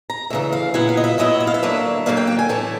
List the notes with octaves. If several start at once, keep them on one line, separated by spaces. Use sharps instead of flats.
A#5
D2 C#3 E3 E5
F5
A#2 F#3 B3 E4 F#5
F5
D#5
E5
A#2 F#3 B3 E4 D#5
E5
F5
E5
D3 F#3 A#3 D4
D3 F#3 A#3 D4 F5
G5
G5
G#5
A2 E3 A3 A5